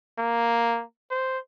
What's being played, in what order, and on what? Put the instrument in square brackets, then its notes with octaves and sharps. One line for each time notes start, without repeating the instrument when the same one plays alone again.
[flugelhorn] A#3
C5